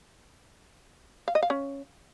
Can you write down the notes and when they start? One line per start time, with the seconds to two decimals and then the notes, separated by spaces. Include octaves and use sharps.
1.28 F5
1.35 D#5
1.43 F5
1.50 C#4